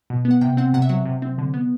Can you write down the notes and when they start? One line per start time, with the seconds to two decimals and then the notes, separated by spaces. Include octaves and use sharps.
0.10 B2
0.25 B3
0.31 F#5
0.41 C3 G5
0.57 C4 F#5
0.73 C3 F#5
0.82 E5
0.89 F#3 F#5
1.06 C3
1.22 C4
1.38 D3
1.54 B3